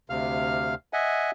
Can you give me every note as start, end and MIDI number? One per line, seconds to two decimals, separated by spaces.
0.10 0.74 38
0.10 0.74 48
0.10 0.74 77
0.10 0.74 89
0.93 1.31 75
0.93 1.31 76
0.93 1.31 78
0.93 1.31 80